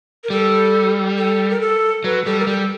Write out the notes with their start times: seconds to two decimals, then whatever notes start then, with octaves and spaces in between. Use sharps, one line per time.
0.24 A#4
0.30 G3 A4
1.18 A4
1.50 A#4
1.61 A4
2.04 F#3 B4
2.25 G3 A4
2.39 A#4
2.47 G3 A4